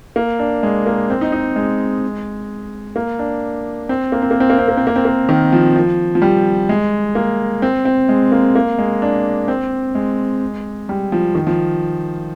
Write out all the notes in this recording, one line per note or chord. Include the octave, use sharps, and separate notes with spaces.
A#3
D4
G#3
A#3
C4
D#4
D#4
G#3
A#3
D4
C4
A#3
C4
A#3
C4
A#3
C4
A#3
C4
A#3
C4
A#3
D#3
F3
F3
F3
G3
G#3
A#3
C4
C4
G#3
A#3
A#3
G#3
D4
C4
G#3
G3
F3
D#3
F3